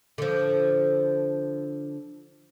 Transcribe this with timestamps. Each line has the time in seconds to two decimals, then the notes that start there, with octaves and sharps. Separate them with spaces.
0.18 D3 F3